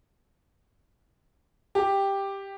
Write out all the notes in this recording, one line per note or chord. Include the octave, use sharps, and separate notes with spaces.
G4